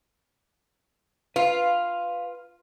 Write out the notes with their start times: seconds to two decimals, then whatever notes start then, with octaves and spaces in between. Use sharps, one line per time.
1.36 F4 B4 F5